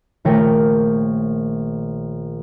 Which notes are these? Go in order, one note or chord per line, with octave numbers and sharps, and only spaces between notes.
A#1 D#3 A3 A#4 C#5 G5